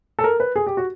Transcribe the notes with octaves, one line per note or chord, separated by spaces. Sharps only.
A4
A#4
B4
G#4
G4
F#4